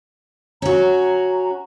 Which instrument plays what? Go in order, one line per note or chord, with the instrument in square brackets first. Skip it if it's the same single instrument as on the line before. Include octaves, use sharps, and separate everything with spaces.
[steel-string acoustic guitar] C#4 F#4 [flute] A#5